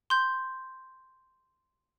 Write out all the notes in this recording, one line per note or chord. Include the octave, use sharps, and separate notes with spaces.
C6 G6